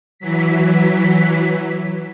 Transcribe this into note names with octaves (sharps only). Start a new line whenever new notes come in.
E3 F#3 B6